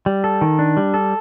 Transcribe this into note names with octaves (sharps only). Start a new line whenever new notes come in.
G3
A4
D#3
D4
G3
A4